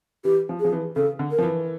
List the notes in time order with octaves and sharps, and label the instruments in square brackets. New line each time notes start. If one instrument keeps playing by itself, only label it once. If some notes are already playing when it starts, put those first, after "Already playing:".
[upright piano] E3 [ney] G4
[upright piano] F3
[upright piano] F3 [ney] G#4
[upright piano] E3
[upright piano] C#3 [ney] A4
[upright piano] D3
[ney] A#4
[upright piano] F3
E3